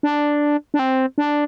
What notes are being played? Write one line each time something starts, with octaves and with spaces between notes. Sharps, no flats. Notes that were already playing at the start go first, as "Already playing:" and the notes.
D4
D4
C4
D4